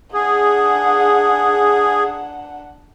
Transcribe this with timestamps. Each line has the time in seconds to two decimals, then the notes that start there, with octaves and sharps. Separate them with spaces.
0.14 D4 G#4 F#5